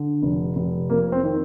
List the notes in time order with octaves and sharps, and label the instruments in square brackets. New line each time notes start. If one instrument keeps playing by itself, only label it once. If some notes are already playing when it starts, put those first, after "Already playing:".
Already playing: [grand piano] D3
F1
F1
F2 A#3
C4
D#3